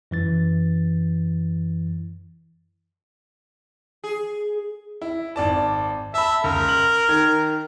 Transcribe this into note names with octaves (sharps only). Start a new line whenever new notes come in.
F#2 E3 A6
G#4
E4
G#1 D5 A5
E5 A5 B5
C#2 A#4
F#7
D#3 G#6